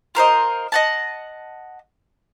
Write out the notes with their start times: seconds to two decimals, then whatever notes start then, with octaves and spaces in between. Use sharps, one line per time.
0.15 F4 A#4 C5 D#5
0.72 D#5 F#5 A5